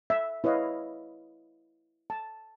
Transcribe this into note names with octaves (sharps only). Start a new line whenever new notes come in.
E5
E4 B4 C#5 D#5 F5
A5